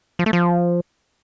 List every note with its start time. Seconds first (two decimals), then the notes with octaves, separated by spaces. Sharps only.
0.19 F3
0.26 A3
0.33 F3